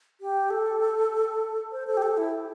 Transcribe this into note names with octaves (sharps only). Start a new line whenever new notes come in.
G4
A4
C5
A4
G4
A4
E4